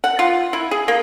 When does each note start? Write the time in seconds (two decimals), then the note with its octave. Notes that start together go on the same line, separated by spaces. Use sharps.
0.04 F#5
0.19 F4
0.53 E4
0.71 G#4
0.88 A#3